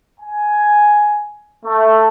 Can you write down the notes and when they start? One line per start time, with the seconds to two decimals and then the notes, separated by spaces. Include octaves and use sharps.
0.19 G#5
1.65 A3